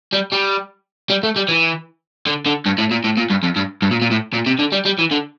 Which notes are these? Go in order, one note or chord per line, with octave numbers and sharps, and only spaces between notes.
G3
G3
G3
A3
G3
E3
D3
D3
G2
A2
A#2
A2
A#2
G2
F2
G2
G2
A#2
A#2
A2
A#2
C3
D3
G3
G3
E3
D3